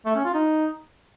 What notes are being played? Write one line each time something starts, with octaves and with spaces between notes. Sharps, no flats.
A3
C#4
F4
D#4